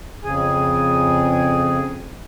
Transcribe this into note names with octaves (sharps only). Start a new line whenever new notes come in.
F2 C#3 G#4 G#5